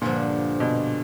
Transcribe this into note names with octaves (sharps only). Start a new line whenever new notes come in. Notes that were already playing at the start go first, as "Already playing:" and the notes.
G2 A#2 D3 F3
B2